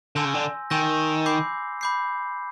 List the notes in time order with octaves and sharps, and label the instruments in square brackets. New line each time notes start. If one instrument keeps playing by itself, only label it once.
[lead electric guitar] D3 [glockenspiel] G#5 C6 E6 G6 A#6
[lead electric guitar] C#3
D3
[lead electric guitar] D#3 [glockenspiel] G#5 C6 E6 G6 A#6
[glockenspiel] B5 D6 G6 C7
B5 D6 G6 C7